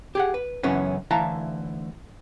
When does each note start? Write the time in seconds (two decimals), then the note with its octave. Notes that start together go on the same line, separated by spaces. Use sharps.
0.15 G4 G#4 F#5
0.34 B4
0.63 F#2 C#3 E3 F#3 B3 C#4
1.11 D2 E3 E4 F5 A5 A#5